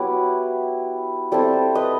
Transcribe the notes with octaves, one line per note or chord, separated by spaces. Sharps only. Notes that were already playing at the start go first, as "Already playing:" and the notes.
Already playing: F#3 B3 E4 G4 B4
G3 C4 E4 A4 C5
B4 D#5